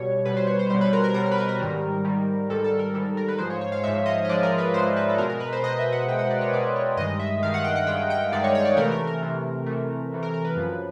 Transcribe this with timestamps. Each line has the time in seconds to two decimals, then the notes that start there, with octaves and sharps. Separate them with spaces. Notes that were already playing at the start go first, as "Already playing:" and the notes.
Already playing: B2 G3 C#5
0.25 B2 G3 B4
0.37 C5
0.47 C#5
0.59 C5
0.70 B2 G3 C5
0.81 B4
0.93 A#4
1.04 A#4
1.14 B2 G3 A#4
1.26 A#4
1.31 B4
1.38 A#4
1.49 A#4
1.59 G#2 D#3 G3
2.05 G#2 D#3 G3
2.50 G#2 D#3 G3 A4
2.64 A4
2.79 A#4
2.94 G#2 D#3 G3 A4
3.17 A#4
3.28 B4
3.38 G#2 F3 G#3 C5
3.50 C#5
3.61 C#5
3.72 F5
3.84 G#2 F3 G#3 E5
4.06 D#5
4.25 D#5
4.29 G#2 F3 G#3 D5
4.43 A#4
4.58 B4
4.74 G#2 F3 G#3 C5
4.97 B4
5.09 A4
5.18 B2 G#3 A#4
5.30 A#4
5.40 B4
5.53 C5
5.63 B2 G#3 D#5
5.79 E5
5.92 F#5
6.08 B2 G#3 G5
6.19 F#5
6.31 D5
6.41 C#5
6.53 B2 G#3 D5
6.76 C#5
6.97 G2 D#3 G#3 D#5
7.19 E5
7.42 G2 D#3 G#3 F5
7.54 F#5
7.64 G5
7.76 F#5
7.87 G2 D#3 G#3 G5
8.10 G5
8.32 G2 D#3 G#3 D5
8.44 C#5
8.55 C#5
8.65 D5
8.77 C3 E3 A3 A#4
8.92 A#4
9.07 A#4
9.22 C3 E3 A3
9.66 C3 E3 A3
10.12 C3 E3 A3
10.23 A#4
10.34 A#4
10.45 B4
10.56 F#2 C#3 F3